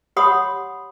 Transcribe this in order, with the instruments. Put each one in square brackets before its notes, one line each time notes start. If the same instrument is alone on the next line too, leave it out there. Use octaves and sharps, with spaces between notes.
[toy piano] G4 C#5 F#5 B5 C6 D#6